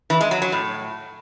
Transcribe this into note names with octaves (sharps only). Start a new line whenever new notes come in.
E3
G#3
F#3
F#3
A2